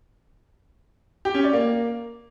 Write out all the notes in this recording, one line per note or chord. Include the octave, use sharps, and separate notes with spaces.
G4
C#4
D5
A#3